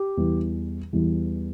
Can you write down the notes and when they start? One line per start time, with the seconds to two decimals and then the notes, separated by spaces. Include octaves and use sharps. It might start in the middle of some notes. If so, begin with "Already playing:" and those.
Already playing: G4
0.17 E2 E3 G3
0.93 E2 E3 G3